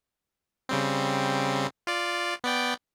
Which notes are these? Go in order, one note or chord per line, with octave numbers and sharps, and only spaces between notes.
C#3 G3 C4
F4 D5
B3 D5 G5